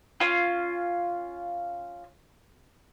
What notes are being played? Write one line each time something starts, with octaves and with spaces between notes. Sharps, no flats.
C#4 F4